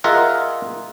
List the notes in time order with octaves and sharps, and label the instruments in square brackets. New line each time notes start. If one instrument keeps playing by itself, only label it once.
[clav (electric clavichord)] F4 G#4 A#4 D#5 E5 F#5